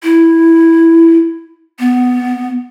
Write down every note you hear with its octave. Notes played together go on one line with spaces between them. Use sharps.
E4
B3